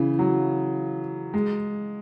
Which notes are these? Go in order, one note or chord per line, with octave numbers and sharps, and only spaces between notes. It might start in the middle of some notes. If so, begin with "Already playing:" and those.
Already playing: C#3 E3
F#3
G#3